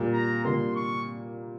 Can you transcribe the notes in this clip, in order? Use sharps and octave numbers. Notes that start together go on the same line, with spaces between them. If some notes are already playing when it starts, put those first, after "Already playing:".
Already playing: A#2 G3 A#3
A#5
A#2 G3 A#3 C6
C#6